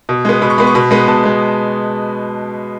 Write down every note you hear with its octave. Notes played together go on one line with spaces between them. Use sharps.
B2
G#3 B3
B2 B5
C#6
G#3 B3 B5
C#6
B2 B5
G#3 B3 B5
B2 A5
G#3 B3